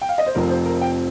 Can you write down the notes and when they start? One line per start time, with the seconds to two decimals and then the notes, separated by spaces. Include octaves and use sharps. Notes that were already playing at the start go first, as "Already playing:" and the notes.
0.01 G5
0.09 F5
0.18 D#5
0.26 C5
0.35 F1 F2 F3 C4 A#4
0.50 C5
0.65 A#4
0.81 G5